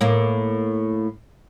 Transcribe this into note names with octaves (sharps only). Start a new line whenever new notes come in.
A2 A#3